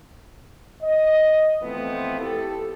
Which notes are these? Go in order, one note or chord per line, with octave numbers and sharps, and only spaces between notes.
D#5
E3 F3 A3 B3 C4
E4 G4 A4